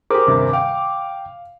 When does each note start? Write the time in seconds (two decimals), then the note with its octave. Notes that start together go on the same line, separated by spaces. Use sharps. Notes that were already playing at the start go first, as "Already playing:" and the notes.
0.10 G4 G#4 A#4 C5 D6
0.27 D#1 G2 C3
0.53 F5 G5